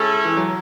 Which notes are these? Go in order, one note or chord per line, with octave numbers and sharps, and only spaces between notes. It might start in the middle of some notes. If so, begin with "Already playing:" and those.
Already playing: G#3 C#4 E4 A4
E3
F#3